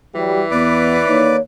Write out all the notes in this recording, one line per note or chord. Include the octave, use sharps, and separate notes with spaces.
E3 F#3 G3 G4
E2 B3 B4 D5 D6
D#3 A#3 D#4 C#5